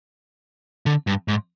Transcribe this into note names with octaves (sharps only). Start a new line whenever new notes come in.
D3
G2
G#2